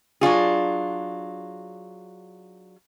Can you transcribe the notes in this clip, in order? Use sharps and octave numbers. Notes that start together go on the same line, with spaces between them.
F#3 D4 F4 G#4